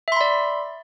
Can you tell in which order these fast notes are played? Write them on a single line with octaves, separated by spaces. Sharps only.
E5 C6 B5 D5